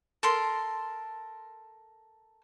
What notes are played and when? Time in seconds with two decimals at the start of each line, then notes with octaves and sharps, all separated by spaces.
0.23 A4 A#4 C6